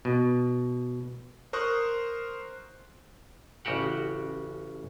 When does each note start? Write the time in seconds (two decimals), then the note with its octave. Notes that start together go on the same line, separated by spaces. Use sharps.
0.05 B2
1.53 A#4 C5 C#6 D#6 F#6
3.65 A1 C#3 F#4 G4 F#5